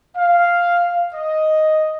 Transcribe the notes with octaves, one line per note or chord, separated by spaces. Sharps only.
F5
D#5